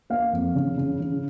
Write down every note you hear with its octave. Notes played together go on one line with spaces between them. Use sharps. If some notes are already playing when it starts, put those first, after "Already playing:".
A#3 F5
F2
C#3
C#3
C#3